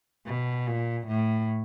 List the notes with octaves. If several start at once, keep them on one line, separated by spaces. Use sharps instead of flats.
B2
A#2
A2